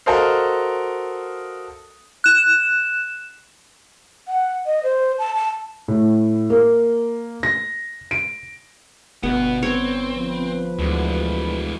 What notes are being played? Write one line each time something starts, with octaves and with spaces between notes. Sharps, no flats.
F#4 A4 A#4 C5 D#5 F5
F#6 E7
F#5
D#5
C5
A5
A5
A2
A#3
A#6
D7
G1 B2 B3 F#5
C4 C#5
F3 B4
D2 E3 G#3